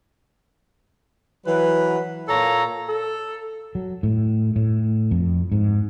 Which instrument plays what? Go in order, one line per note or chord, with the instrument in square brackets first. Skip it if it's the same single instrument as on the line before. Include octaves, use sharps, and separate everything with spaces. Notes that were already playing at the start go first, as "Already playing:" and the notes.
[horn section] E3 F#3 B4
A#2 F4 A4 C#5 A#5
[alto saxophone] A4
[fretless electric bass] F#3
A2
A2
F2
G#2